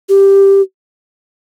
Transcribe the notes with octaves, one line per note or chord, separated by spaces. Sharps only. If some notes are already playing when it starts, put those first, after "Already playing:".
G4